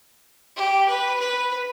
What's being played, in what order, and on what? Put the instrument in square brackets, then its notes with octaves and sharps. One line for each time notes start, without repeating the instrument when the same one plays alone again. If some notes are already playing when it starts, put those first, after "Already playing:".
[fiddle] G4
B4
B4